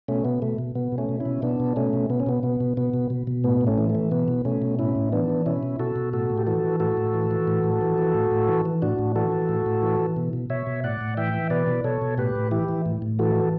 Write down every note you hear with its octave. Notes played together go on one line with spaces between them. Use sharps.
B2 A3 C#4
B2 B3
B2 A3
B2
B2 B3
B2
A3 C#4
B2
C#4 E4
B2
B2 B3 D4
B2
B2 A3 C#4
B2
B2 B3
C#4
B2 B3
B2 B3
B2
B2 B3
B2
B2
B2
A2 B3
A2
A3 C#4
E3
A3
E3
B2 B3
B2
B2 A3 C#4
B2
A2 C#4 E4
A2
E3 B3 D4
E3
B2 C#4 E4
B2
B2 F#4 A4
B2
A2 F#4 A4
A2
G4
E3 F#4 A4
E3
A2 F#4 A4
A2
E3
E3
A2
A2
E3
E3
A2
A2
E3
E3
A2 D4 F#4
A2
E3 F#4 A4
E3
A2
A2
E3
E3
B2
B2
B2 C#5 E5
B2
A2 D5 F#5
A2
E3 E5 G5
E3
B2 B4 D5
B2
B2 A4 C#5
B2
A2 G4 B4
A2
E3 E4 G4
E3
A2
A2
E3 F#4 A4
E3